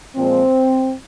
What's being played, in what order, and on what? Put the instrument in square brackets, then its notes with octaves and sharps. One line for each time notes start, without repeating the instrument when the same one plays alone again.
[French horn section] A#2 F3 G#3 C4